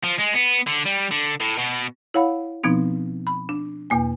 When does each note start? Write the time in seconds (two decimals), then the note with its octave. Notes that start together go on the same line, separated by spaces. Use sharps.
0.04 F3
0.19 G#3
0.34 B3
0.67 D3
0.86 G3
1.11 D3
1.40 A2
1.58 B2
2.14 E4 C#5 F5 F#5 B5
2.64 B2 F3 B3 C4 D#4
3.27 B5
3.49 D4
3.90 E2 B2 A#3 G#5